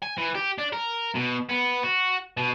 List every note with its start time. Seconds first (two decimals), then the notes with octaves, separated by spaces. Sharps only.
0.03 G#5
0.18 E3
0.35 G4
0.58 D4
0.73 A#4
1.15 B2
1.49 B3
1.83 F#4
2.37 B2